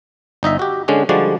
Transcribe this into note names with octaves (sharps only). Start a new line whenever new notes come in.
G1 D#4 D#5 E5
F#4 G4
D3 G#3 C#4 D4
D3 F3 G3 G#3 F#4 D5